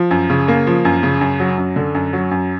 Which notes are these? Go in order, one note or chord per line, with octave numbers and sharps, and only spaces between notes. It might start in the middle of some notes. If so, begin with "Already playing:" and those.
Already playing: F3
F#2
C#3
A#3
F3
F#2
C#3
F#2
F#3
F#2
D3
F#2
F#3
F#2